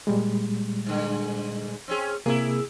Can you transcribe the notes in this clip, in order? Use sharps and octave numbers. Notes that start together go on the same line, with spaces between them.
A#2 G3 G#3
G#2 D3
C4 C#4 G#4
C3 A#3 E4 G#4